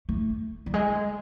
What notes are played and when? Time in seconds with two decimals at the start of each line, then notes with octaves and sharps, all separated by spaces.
0.09 A3
0.66 G3
0.74 G#3